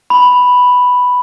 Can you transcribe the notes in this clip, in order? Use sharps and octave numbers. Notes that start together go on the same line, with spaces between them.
B5